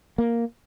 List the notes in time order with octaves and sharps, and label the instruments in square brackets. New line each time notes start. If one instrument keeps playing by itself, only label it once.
[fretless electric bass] A#3